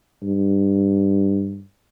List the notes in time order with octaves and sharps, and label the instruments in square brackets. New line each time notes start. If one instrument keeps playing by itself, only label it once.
[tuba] G2